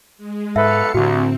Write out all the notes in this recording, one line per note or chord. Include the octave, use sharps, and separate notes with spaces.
G#3
B1 G#2 A4 B4 E5 F5 C#7
C2 A2 D3 C4 F#4